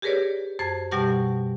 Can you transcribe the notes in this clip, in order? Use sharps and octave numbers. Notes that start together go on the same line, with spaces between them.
G4 G#4 A#4 B4 C#5 D5
F#2 C5 A5 G#6
B2 G3 G4 F#5 A5 C#6